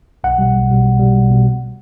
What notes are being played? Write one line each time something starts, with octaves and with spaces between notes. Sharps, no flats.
B1 F#5
B2 G3
B1
B2 G3
B1
B2 G3
B1
B2 G3